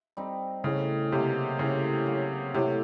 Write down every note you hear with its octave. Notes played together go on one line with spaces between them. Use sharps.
G3 C4 D#4
A2 C#3
C3 F#3 A#3
A2 C#3
F#3 A#3
A2 C3